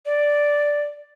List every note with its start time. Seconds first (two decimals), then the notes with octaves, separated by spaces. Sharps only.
0.06 D5